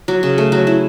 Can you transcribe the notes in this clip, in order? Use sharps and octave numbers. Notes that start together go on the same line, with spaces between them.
F#3
C#3
A3
F#3
E4